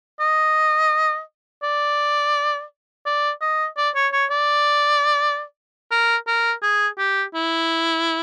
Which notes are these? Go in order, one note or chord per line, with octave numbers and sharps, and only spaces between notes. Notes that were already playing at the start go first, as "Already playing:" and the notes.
D#5
D5
D5
D#5
D5
C#5
C#5
D5
A#4
A#4
G#4
G4
E4